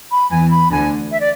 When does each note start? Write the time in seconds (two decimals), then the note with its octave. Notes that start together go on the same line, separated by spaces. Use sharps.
0.11 B5
0.31 E2 E3 G#5
0.50 B5
0.71 D2 D3 G#5
1.11 E5
1.20 D5